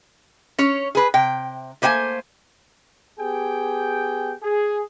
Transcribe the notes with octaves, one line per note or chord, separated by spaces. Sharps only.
C#4 C#5
G#4 B4
C3 G5
A3 A#3 C5 G5 G#5
B3 G4 G#4 G5
G#4